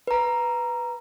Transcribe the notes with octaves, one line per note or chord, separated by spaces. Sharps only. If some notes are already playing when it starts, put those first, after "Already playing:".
B4 A#5